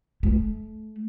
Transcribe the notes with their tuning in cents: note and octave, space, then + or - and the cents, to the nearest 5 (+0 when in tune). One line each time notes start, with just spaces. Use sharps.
A3 -25